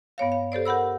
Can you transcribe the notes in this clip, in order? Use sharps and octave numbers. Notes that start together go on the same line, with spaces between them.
G2 B3 C#5 F5
F5
G4 A4 C5 D5
G4 A#4 F#5 B5 E6